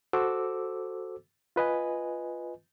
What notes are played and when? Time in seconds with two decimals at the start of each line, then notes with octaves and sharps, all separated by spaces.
0.13 F#4 A4 C5 D6 E6
1.56 F4 B4 D#5 G#5